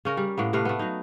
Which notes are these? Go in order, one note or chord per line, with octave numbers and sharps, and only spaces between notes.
C#3 C#4 A#4
G3
A2 A#3 B3
C3 A3 B4 F5
A3 B3
F#3 D#4